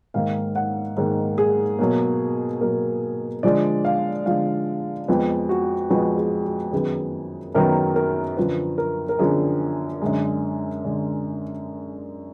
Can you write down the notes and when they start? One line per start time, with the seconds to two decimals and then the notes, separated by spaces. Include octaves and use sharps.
0.14 G#2 D#3 A#3 F5
0.56 F#5
0.97 G#2 D#3 A#3 G#4
1.38 G#4
1.79 B2 F#3 A#3
2.61 B2 F#3 A#3 A#4
3.43 D3 F3 G#3 D5
3.85 F5
4.26 D3 F3 G#3 F5
5.08 F2 F3 G#3 B3 G#4
5.49 F#4
5.90 F2 F3 G#3 B3 F#4
6.17 G#4
6.45 F#4
6.72 F#2 D#3 F#3 B3 G#4
7.55 F#2 D#3 F#3 B3 A#4
7.96 A#4
8.37 F#2 D3 F3 B4
8.78 A#4
9.09 A#4
9.19 F#2 D3 F3 G#4
10.02 F#2 D3 G#3
10.84 D3 G#3